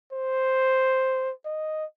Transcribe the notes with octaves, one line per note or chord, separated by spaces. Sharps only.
C5
D#5